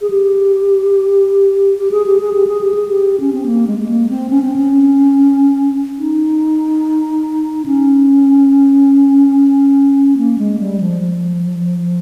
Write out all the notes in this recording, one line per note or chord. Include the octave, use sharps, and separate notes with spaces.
G#4
G4
G4
G#4
G4
G#4
G4
G#4
G4
G#4
G4
C#4
C4
A#3
G#3
G#3
A#3
C4
C#4
C4
C#4
D#4
C#4
A#3
G#3
G3
F3
F3